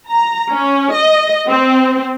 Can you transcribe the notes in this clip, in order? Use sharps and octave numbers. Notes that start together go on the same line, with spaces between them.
A#5
C#4
D#5
C4